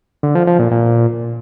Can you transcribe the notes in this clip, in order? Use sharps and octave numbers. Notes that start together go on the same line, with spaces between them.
D3
F3
F3
A#2
A#2